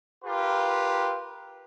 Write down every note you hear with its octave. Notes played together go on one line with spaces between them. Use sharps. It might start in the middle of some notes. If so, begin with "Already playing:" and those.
F4 G4 A#4 B4